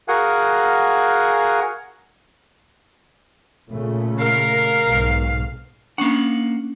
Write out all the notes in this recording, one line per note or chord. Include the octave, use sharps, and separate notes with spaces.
F#4 G#4 A#4 F5 F#5 G#5
A#2 C#3 A3
A#4 F5
B1 G#2 B2
A#3 C#4 D4 F#5